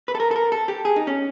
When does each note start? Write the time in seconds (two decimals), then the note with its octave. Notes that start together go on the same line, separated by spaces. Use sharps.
0.08 B4
0.15 A4
0.20 A#4
0.31 A4
0.36 A#4
0.52 A4
0.68 G4
0.85 G#4
0.96 D#4
1.07 C#4